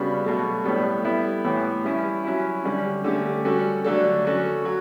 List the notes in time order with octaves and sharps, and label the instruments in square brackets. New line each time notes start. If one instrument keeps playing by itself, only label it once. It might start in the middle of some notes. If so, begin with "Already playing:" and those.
Already playing: [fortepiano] C#3 G3 B3 D4 F#4
B2 F#3 A3
A2 G3 B3 D4 A4
G3 B3 E4 A4
A2 E3 B3
G3 C#4 E4
F#3 C#4 E4
D3 G3 C#4
D3 A3 C#4 G4
G3 C#4 F#4 A4
D3 F#3 A3 D4 A4
F#3 C#4 F#4 A4
F#3